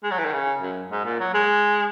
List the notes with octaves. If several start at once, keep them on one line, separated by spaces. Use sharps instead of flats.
G#3
F#3
E3
D#3
C#3
F#2
G#2
A#2
F#3
G#3